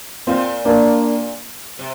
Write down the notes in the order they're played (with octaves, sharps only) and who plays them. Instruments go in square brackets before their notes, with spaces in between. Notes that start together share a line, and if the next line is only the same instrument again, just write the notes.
[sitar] A#2 [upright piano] C4 F4
[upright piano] A#3 D4
[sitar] C3